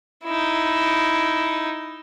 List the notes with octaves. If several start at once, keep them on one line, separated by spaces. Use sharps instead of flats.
D#4 E4